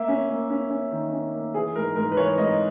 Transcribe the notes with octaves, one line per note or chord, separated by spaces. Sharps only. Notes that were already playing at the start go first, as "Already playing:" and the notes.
Already playing: A#3 E5
C#4
A#3
C#4
C#4
D#3
C#4
A#3
E3 G#4
G#2 A#4
G#2 A#4
B4
E3 C#5
G#2 D#5